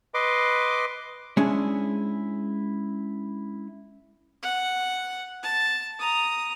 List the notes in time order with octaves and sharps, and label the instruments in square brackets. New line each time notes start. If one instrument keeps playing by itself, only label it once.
[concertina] B4 D#5 C6 D6
[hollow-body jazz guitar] G#3 C#4 D4 E4 G#4
[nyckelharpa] F#5
A5
A#5 D#6